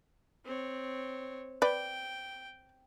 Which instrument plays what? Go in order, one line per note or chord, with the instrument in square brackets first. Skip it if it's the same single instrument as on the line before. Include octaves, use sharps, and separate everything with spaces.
[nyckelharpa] C4 C#5
[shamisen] B4 D5 [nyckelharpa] G5